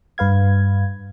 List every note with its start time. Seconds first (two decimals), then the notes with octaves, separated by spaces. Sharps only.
0.18 G2 B4 F5 G#6